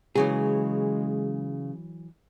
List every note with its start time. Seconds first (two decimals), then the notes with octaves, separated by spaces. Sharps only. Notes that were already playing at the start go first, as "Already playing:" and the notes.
0.15 C#3 E3 F#3 G#3 G#4